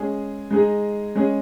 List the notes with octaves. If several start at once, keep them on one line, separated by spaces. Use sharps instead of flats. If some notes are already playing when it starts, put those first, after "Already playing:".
Already playing: G#3 C#4 G#4
G#3 D#4 G#4
G#3 C#4 G#4